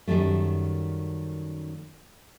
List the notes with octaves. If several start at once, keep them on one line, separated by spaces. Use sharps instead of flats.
F#2 D#3 F3 G3 A3